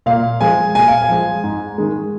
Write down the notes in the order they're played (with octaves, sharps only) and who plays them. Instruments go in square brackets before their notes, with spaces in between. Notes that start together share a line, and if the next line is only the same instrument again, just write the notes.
[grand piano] A#2 F5
F3 G#3 G#5
A#2 G#5
F5
G#5
F3 G#3
G#2
D#3 G#3